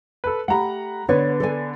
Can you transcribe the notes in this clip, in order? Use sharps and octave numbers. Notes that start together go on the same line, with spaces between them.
A4 B4
A3 G4 F#5 A#5 B5
D3 B3 B4 C#5 D5
A4 D5 G#5